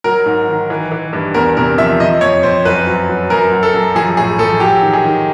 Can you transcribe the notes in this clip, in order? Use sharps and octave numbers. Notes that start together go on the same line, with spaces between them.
F#3 A#4
G#2
D#3
E3
E3
G2
E2 A#4
C3 A#4
F3 E5
F3 D#5
F2 C#5
F2 C5
F#2 B4
F#3
F#3
F#2 A#4
F#2
A4
F#2
F3 G#4
A2 G#4
F3 A4
F#3 G4
D#3
G#4
D#3